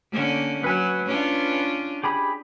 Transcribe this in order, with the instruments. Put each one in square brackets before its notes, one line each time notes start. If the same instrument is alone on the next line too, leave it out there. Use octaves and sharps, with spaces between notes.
[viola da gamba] D3 A#3 C#4
[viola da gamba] F#3 [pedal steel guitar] B4 G#5 F#6
[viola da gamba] C#4 D4 F4
[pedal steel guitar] G4 G#4 B5